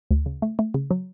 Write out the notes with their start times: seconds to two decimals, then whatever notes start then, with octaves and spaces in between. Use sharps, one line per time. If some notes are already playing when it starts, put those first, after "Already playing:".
0.11 D2
0.26 C#3
0.42 A3
0.59 A3
0.74 C#3
0.91 F#3